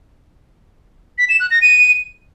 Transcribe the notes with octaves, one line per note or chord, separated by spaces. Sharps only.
B6
E7
F#6
A#6
D#7